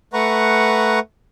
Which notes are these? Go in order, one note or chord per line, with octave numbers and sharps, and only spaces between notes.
A3 B4 F#5 A#5 C#6